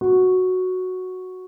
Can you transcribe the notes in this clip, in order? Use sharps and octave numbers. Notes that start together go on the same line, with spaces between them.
F#4